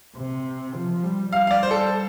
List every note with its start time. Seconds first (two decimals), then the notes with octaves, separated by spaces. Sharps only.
0.17 C3
0.75 F3
1.04 G3
1.32 G3 F5
1.47 F5
1.51 D5
1.63 C5
1.71 A4